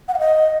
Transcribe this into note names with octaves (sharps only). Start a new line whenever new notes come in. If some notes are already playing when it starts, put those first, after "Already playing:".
F#5
F5
D#5